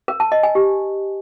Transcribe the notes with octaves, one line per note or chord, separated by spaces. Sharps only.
A#4
A5
D#5
G#5
G4